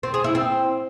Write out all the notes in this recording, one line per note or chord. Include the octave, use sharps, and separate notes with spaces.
C4
G#4
E4
C4